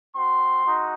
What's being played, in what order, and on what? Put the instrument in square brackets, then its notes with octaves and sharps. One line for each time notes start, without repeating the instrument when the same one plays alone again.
[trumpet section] C4 F#4 C6
G#3 D#4 F#4